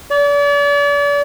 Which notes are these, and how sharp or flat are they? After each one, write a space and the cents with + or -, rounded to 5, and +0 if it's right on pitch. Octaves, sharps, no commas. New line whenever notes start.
D5 -40